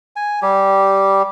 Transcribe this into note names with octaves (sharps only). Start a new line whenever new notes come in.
G#5
G3 G4